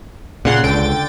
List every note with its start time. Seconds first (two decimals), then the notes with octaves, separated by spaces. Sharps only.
0.45 A#2 C#3 F#5 C6
0.63 C#2 D3 G5 A6